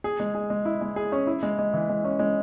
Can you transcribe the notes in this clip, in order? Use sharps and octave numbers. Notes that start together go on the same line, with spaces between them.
G#4
G#3
G#4
G#3
E4
G#3
G#4
C#4
E4
G#3
G#3
E3
G#3
C#4
G#3